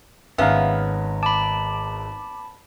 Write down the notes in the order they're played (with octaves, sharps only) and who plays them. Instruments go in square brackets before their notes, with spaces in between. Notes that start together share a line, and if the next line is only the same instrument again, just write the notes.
[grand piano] G#1 A#5 [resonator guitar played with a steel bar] B3 C#4 [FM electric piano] E5 F5
[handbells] A5 B5 [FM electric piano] D6